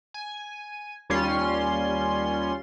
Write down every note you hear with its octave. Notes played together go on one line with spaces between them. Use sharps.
G#5
D#2 G3 C#4 F4 C6